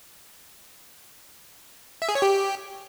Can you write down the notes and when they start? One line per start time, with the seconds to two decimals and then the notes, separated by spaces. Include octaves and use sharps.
2.02 E5
2.09 G#4
2.15 C#5
2.22 G4